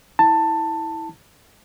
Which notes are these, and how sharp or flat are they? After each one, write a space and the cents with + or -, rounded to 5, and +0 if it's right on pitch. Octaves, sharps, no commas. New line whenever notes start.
E4 -20 A5 +15